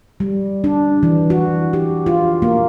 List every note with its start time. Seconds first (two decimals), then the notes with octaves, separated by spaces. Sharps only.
0.20 G3
0.64 D4
1.03 E3
1.30 F#4
1.73 G4
2.06 F4
2.42 A#3